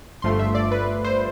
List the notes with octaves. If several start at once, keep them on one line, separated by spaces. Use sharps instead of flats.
G1 G2 F3 A3 C6
E5
D5
B4
C5